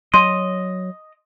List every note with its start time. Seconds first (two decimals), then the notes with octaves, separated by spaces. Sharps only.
0.14 F#3 D#5 C6